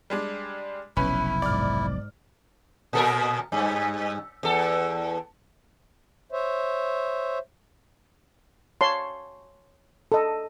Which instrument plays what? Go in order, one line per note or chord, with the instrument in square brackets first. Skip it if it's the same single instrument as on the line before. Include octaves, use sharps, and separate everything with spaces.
[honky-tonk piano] G3 G#3 D4
[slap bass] F1 B1 [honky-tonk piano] C#4 B4 [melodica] E4
[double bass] G#2 [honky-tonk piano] D5 F6
[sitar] A#2 A4 A#4
G2
E2 A4
[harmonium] C5 C#5 E5
[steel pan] C#5 A5 C6
A4 D#5